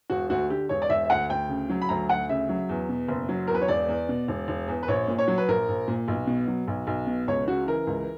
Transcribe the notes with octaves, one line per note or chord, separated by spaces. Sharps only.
E1 F#4
D2 F#4
D3 G4
E1 C#5
D5
E1 E5
E5
D2 F#5
D2 G5
C#3
F#3
B5
D2 A#5
D2 F#5
C#3 E5
F#3
E2
B2
F#1
F#3
E2 A#4
B4
C#5
E1 D5
E2
B2
E1
E1
E2
B4
A#1 C#5
A#2
C#5
F#3
B4
A#1 A#4
A#1
A#2
B1
B2
F#3
B1
B1
B2
C#2 C#5
C#3 F#4
E3 A#4
C#2